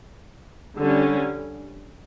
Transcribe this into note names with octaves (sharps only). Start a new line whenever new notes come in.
D3 G3 C#4